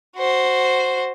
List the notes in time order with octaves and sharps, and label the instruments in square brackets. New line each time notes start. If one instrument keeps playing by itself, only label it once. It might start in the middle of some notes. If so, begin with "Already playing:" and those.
[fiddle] F#4 C5